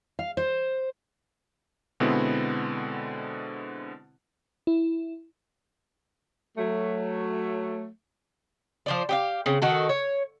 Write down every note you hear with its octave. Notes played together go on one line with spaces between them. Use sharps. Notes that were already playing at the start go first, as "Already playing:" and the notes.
F5
C5
B2 D3 G#3 B3 C4 E4
E4
F#3 A3
F3 C5 D5
G4 G#4 F5
C#3 C4
D#3 F#4 A4
C#5